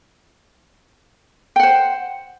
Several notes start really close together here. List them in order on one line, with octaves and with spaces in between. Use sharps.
G5 F#5 C5